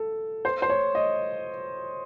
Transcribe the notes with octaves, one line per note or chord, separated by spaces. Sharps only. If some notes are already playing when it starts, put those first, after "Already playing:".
Already playing: A4
C5
C5
C#5
D#5